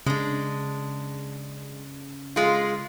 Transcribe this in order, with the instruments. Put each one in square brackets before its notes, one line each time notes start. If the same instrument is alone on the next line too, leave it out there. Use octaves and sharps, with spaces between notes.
[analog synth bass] C#3 [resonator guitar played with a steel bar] G#3 D4
[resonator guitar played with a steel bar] G#3 F4